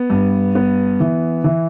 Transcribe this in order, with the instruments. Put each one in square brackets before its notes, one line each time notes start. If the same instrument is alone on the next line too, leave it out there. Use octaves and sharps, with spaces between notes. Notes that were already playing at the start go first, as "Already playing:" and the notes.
Already playing: [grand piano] B3
G2
B3
E3
E3